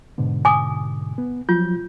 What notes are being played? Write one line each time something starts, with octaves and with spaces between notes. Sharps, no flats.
G#2 B2 D3
G#5 D6 D#6
B3
F3 F#3 F4 G6